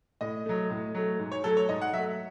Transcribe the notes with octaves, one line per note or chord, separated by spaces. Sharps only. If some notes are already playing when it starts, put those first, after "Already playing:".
A2 D#5
F#3 A3
A2
F#3 A3
G#2
C#5
F#3 A3 A4
C#5
G#2 D#5
F#5
F#3 E5
A3